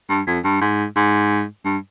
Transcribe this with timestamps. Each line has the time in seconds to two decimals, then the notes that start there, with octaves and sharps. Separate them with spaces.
0.10 G2
0.27 F2
0.44 G2
0.61 G#2
0.96 G#2
1.65 G2